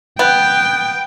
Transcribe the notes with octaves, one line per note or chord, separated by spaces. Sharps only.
B3 G5